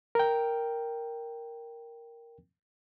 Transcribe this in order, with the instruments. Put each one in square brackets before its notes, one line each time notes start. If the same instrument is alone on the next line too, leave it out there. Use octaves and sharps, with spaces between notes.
[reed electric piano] A#4 G5